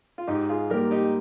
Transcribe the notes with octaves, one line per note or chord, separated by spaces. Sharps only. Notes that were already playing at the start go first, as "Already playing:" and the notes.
F4
G#2 D#4 G4
F4 G#4
G3 A#3 G4 A#4
D#4 G4